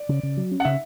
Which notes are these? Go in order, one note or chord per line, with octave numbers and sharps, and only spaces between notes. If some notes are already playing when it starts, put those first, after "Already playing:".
Already playing: D5
C#3
C#3
F#3
C#4
F#5
C#3 E5